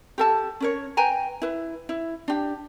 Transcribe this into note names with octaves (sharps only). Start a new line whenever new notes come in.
G4 A4 A5
C#4 A#4 C#5
B4 G5 G#5 A#5
E4 B4
E4
D4 G4